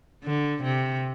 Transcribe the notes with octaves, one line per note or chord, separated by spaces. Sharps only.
D3
C3